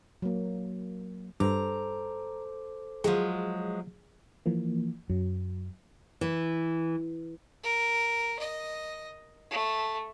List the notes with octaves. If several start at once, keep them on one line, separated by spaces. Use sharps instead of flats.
F#3 A#3
G2 A4 C5 A#5 D6
F3 F#3 G#3 G#4
E3 F3 A#3
F#2 F#3
E3
A#4
D#5
A3